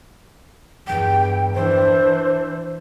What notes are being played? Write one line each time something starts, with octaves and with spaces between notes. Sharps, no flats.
E2 G2 G5
E3 D4 C5